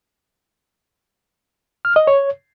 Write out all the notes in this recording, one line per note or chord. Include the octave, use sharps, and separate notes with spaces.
F6
D#5
C#5